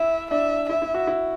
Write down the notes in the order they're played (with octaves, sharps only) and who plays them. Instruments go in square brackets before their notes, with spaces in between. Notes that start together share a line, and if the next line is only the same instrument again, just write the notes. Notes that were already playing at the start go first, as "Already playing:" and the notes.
Already playing: [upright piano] E4 [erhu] E5
[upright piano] D4 [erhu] E5
[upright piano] E4 [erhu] E5
[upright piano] E4
F#4
E4